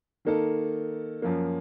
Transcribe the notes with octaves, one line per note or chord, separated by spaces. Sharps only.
D#3 A#3 D#4 A4
F#2 F3 A#3